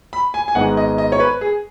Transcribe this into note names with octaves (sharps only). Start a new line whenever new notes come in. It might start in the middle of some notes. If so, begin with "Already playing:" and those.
B5
G#5
G#5
G#1 G#2 G#3 B3 F#5
D#5
D#5
C#5
B4
G#4